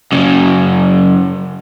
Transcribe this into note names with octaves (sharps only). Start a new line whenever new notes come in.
F#2 C#3